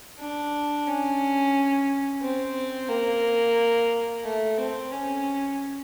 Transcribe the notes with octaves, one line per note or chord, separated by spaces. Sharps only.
D4
C#4
C4
A#3
A3
C4
C#4